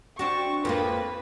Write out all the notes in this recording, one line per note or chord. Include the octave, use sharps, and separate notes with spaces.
C4 D4 F#4 C#6
F2 F3 A#3 B4